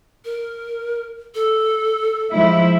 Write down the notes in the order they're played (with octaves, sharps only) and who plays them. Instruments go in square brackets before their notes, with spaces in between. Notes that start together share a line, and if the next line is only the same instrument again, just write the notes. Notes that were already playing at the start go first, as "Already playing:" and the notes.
[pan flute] A#4
A4
[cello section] F3 G#3 E4